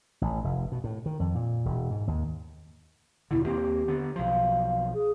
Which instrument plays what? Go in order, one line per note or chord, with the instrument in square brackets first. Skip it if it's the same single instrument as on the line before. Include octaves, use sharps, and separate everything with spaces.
[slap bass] A1
F1
B2
A2
D#3
F2
A#2
E1
G#2
D#2
[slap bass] D#2 B2 D3 [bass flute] E4
[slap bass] D#2 A#3 C4 [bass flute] G4
[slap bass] D3 B3
[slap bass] B1 F3 [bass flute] F5
[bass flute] G#4